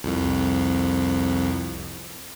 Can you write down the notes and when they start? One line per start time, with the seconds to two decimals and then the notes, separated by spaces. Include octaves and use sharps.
0.04 C2 F2